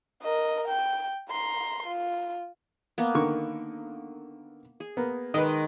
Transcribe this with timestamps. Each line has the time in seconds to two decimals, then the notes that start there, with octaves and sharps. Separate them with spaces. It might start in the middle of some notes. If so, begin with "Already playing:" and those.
0.23 A#4 D#5
0.68 G5
1.30 A#5 C6
1.87 F4
2.98 A#3 B3
3.15 D3 D#3 C#6
4.80 G#4
4.97 A#3 B3
5.34 D#3 G#3 B4 D#5 D6